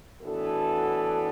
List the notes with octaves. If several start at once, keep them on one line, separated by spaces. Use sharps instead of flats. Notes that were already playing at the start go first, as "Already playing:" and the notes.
A2 E3 B3 D4 F#4 A4